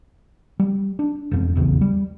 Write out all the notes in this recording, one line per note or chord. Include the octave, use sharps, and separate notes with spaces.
G3
D4
E1 F2
A#1 E2 C#3
G3